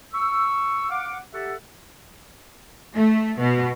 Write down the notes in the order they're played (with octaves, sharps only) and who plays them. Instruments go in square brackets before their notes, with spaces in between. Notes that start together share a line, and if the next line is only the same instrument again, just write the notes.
[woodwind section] C#6 E6
F5 F#5 D6
G4 A4 E5 F#5
[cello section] A3
B2